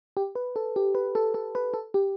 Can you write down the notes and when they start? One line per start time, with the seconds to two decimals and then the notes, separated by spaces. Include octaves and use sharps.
0.17 G4
0.35 B4
0.56 A4
0.76 G4
0.95 B4
1.15 A4
1.34 A4
1.55 B4
1.74 A4
1.94 G4